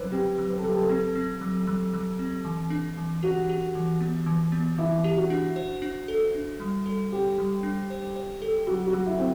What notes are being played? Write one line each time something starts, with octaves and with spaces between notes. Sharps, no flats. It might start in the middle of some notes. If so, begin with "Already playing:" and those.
Already playing: F#3 E4 B4 C5
C4 G4
F#3
B4
A4
F#3 G4
A4
C4 A4
C4
F#3
F#3
F#3
C4
E3
D4
E3
F#4 G4
G4
E3
B3
E3
B3
E3 E4
G4
F#4
D4
C5
D4
A4
D4
G3
A4
G4 C5
G3
D4
C5
C5
A4
F#3 F#4
F#4
F#3
E4
C4